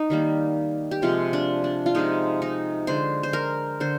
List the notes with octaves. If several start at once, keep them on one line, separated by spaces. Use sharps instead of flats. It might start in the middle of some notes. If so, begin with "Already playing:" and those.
Already playing: D#4
D#3 G3 A#3
G4
C3 F3 G#3 F4
D4
D4
F4
C3 F3 G#3 D#4
D#4
D3 G#3 C5
C5
A#4
D3 C5